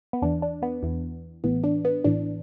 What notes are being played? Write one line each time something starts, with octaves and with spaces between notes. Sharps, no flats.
B3
E2 E3 D4
D4
B3
E2 E3
A1 A2 E3 B3
D4
B3
A1 A2 E3 D4